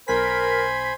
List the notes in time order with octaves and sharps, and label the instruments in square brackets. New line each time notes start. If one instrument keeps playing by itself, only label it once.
[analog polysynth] B1 B6 [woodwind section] A#4 [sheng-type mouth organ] C5 G#5 B5